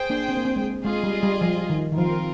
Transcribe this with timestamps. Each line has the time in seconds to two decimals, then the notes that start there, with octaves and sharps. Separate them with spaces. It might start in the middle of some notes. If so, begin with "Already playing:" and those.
Already playing: G#4 C5 G5
0.10 A#3 D4
0.29 C4
0.37 A#3
0.45 C4
0.56 G#3
0.84 G#3 F4 G#4 D#5
1.04 G3
1.23 G3
1.41 F3
1.70 D#3
1.92 D#3
1.98 F3 C4 F4 A#4